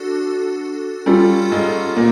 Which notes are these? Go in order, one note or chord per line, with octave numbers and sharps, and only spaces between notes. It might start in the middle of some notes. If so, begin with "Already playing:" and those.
Already playing: D4 F#4 A4
G3 C#4 F4 A4
G#2 G#3
A#2 A#3